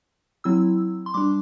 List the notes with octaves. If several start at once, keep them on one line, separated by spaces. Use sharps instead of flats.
F#3 C4 E4 E6
C6
G3 D4 D6